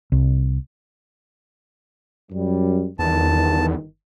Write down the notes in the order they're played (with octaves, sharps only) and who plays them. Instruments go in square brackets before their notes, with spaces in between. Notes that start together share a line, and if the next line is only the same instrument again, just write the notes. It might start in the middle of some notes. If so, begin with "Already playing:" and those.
[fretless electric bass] C2
[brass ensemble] F#2 G3
[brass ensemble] G1 D#3 [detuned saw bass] E2 [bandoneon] A5